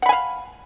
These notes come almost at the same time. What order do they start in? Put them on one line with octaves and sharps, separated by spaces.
F#5 B5 G#5 F5